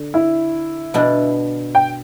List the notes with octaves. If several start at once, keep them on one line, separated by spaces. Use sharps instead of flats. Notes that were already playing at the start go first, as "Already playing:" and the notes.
Already playing: D3
E4
B2 B3 D4
G5